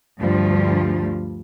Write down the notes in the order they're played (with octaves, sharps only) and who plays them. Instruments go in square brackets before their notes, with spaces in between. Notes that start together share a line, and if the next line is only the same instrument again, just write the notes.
[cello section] D2 G2 F3 G3